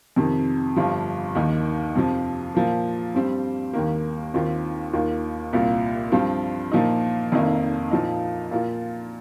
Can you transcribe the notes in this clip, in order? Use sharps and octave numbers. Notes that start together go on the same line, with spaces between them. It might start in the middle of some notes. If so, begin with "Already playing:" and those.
F2 C3 D#3
G1 G2 F3
D#2 D#3 A#3 D#4
F2 C3 F3
A#2 F3 A#3
G2 G3 C4
D#2 D#3 A#3
D#2 D#3 C4 F4
D#2 D#3 A#3 F4
C2 A#2 A#3 F4
G2 F3 C4 F4
A#2 F3 A#3 D#4
F1 F2 D#3 A#3 D#4
A#2 F3 D#4
A#2 A#3 F4